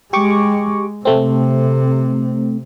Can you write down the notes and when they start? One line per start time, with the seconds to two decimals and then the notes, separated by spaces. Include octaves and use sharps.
0.13 G#3 G4 C#6 D6
1.05 C3 A3 C4